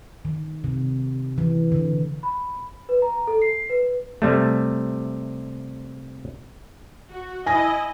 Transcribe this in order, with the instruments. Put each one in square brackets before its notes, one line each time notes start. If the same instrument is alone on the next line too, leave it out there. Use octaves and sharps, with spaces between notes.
[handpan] D#3
C3
E3
D3
[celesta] B5
B4
A#5
A4
C7
B4
[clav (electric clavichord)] C3 G3 A3
[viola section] F#4
[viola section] E4 D#5 [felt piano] G#5 A#6